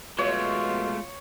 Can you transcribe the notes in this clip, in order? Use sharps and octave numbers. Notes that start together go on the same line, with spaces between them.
B2 G#3 A3 F4 C#5